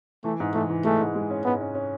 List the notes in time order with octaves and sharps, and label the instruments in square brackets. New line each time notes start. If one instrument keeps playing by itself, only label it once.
[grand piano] E3 [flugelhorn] A3
[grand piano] G#2
[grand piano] E3 [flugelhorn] A3
[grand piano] E3
[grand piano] G#3 [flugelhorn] A3
[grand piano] G#2
G#3
C#4
[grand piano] G#2 [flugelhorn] B3
[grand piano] C#4
C#4